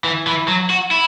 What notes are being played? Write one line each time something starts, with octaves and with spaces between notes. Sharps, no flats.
E3
E3
F#3
F#4
E4